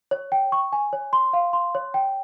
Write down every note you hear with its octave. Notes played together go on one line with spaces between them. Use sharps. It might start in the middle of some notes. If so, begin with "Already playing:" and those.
C#5
G5
C#6
G#5
C#5
C6
F5
C6
C#5
G5